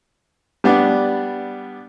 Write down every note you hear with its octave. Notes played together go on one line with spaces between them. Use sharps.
G3 B3 D4